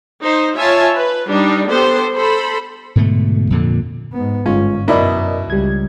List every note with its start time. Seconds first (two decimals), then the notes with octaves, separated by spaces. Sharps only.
0.21 D#4 C5
0.56 F4 C#5 E5 G#5 A5
0.96 B4
1.29 G3 D4 D#4
1.69 B3 G4 A4 C5
2.16 A4 C5 B5
2.96 G#2 B2 D3 A3
3.50 F2 A#2 D3
4.13 G#2 B3
4.46 G1 G#2 G#3 C#4 F4
4.88 F#2 B2 E4 A#4 D5 D#5
5.50 C#2 G3 G#6